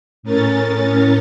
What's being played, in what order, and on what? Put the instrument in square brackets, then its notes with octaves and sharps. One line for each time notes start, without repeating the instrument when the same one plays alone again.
[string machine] A2 C#4 A#4 A6